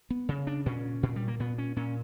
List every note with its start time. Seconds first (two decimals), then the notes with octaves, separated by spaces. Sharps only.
0.10 B3
0.29 C#3
0.47 D4
0.66 A#2 C#4
1.03 A#2
1.16 G3
1.28 A#3
1.40 A#2 B3
1.58 C#4
1.76 A#2 C#4